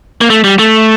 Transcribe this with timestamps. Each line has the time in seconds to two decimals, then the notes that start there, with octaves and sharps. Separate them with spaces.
0.21 A#3
0.30 A3
0.44 G3
0.59 A3